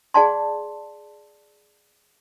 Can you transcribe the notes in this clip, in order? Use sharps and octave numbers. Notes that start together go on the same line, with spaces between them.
G#4 D5 F#5 A5 C6